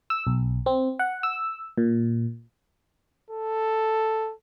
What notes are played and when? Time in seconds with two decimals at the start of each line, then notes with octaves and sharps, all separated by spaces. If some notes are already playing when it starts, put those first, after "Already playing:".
0.10 E6
0.27 B1
0.66 C4
0.99 F#5
1.23 E6
1.78 A#2
3.30 A4